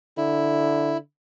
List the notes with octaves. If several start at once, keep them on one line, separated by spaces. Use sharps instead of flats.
D3 E4